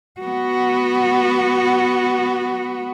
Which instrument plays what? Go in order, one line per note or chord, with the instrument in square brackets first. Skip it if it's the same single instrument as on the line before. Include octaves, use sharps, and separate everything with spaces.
[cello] B3 F#4